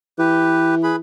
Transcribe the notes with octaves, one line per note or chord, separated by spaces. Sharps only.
E3 G4 B4
G#4 B4 B5